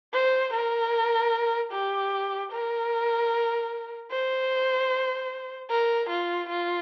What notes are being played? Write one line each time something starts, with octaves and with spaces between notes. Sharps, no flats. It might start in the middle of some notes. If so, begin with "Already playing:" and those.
C5
A#4
G4
A#4
C5
A#4
F4
F4